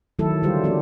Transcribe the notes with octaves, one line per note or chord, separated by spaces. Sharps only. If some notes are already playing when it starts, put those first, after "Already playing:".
D#3 F#3 A3 E4 A4
D3 F#3 G3 F4 G4 C5
F3 A#3 C#4 D4 G4